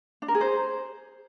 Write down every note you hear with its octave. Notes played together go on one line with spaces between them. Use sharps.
D4
A#4
G#4
C5